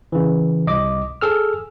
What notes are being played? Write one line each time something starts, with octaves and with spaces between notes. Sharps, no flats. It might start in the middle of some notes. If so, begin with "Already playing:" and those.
C#3 E3
C2 D#5 D6
G#4 A4 E6 F6